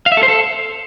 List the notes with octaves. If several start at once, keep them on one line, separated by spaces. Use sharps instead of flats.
F5
E5
A4
C5
A4